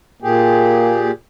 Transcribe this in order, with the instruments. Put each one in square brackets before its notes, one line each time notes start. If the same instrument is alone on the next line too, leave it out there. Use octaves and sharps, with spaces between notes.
[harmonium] A#2 G4 G#4 [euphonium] A#3